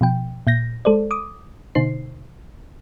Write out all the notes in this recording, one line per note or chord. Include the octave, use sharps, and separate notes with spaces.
B2 F3 G5
A#2 G6 A#6
G#3 A4 C5 D5
D6 D#6
B2 D3 D#4 C5 C7